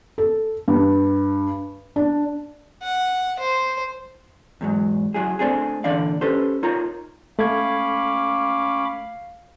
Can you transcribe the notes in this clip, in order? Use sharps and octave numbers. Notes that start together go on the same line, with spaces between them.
A4
G2
D4
F#5
C5
E2 G#2 F#3
F#3 E4 G#4
A3 C4 D4 G#4
A#2 D3 E3 D4 D5 F5
C#4 G4 A4 B4 C5
D#4 F4 A#4 C#5 A#5
A3 C#4 F5 B5 D6 G#6